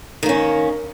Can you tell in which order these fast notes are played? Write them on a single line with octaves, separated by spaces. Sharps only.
D#3 A#3 C#4